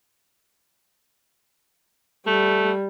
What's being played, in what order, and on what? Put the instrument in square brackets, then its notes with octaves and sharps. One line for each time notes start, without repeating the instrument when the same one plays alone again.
[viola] G3 [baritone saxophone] A3